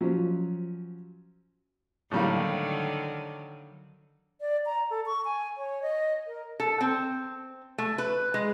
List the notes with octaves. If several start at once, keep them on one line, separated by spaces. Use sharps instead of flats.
F3 F#3 C#4
A2 D3 D#3 F#3 G3 A#3
D5
A#5
A4
C#6
G#5
C#5
D#5
A#4
A4
C4
A3
B4
G#3